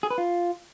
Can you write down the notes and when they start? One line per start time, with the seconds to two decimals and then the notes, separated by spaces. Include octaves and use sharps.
0.03 G#4
0.11 B4
0.18 F4